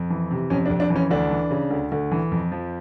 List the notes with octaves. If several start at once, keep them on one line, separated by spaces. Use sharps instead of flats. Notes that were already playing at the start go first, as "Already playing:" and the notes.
Already playing: F2
E3
C3
F2 C#4
D4
F2
D4
E3
C#4
D2 D4
E3
C#3
D2
D2
E3
F2
F3